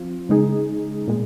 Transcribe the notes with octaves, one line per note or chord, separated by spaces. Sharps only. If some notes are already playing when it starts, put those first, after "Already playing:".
Already playing: F3 C4 F4
C#3 G#3 D#4 G#4
A#2 G#3